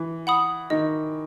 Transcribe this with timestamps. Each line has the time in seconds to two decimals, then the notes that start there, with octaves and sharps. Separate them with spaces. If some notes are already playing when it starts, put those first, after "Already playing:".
Already playing: E3
0.27 F#5 B5 D#6
0.70 D#3 D#5